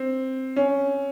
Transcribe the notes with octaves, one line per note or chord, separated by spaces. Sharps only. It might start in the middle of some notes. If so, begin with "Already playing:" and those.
Already playing: C4
C#4